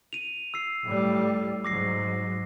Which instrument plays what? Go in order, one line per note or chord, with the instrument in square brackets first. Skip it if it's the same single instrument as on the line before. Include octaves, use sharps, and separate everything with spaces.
[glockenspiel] D#7 F7
E6 C7
[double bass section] A2 G3
[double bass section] G#2 F#3 [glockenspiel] D6 A#6 C7